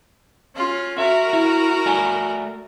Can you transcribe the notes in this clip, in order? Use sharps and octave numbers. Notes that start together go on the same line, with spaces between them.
C#4 F4
F#4 A#4 E5
E4
A3 D5 G#5